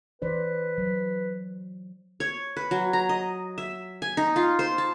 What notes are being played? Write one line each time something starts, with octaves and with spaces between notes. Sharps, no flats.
E3 B4 C5 D5
F#3
C#5
B4
F#3
A#5
D#5
E5
G#5
D#4
F4
C5
A5